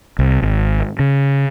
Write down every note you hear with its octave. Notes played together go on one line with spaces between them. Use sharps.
C2
G#1
C#3